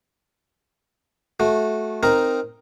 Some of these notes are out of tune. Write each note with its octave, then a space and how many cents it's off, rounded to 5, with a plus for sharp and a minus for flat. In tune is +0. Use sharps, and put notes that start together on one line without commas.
A3 -20 F#4 -15
C4 +0 D#4 +0 A#4 +0